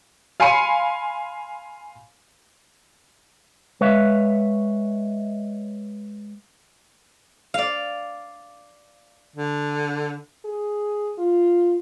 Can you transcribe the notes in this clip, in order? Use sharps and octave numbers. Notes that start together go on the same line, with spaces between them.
F5 G#5 B5 C6 C#7 D#7
G#3 B4 C#5 E5 F5
D5 F5
D3
G#4
F4